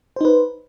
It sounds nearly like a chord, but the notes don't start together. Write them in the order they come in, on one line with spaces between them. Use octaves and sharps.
C5 D#4 B4